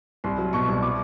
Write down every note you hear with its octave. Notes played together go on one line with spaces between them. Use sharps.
C2 C6
F#3
B2 C#6
C2
D6